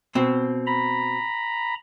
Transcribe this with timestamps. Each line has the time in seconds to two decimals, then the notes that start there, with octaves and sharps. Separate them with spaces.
0.15 B2 C4
0.67 A#5 B5